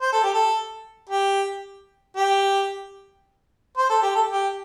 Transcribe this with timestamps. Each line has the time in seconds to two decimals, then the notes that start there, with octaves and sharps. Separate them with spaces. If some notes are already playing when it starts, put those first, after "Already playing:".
0.01 C5
0.12 A4
0.23 G4
0.34 A4
1.09 G4
2.16 G4
3.77 C5
3.90 A4
4.02 G4
4.15 A4
4.31 G4